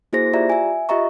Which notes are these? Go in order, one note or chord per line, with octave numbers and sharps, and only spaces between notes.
A#3 E4 F#4 G#4 C5 A#6
F4 G4 D5 E5 A#5
E5 G#5
F4 G4 D#5 E5 A#5 C#6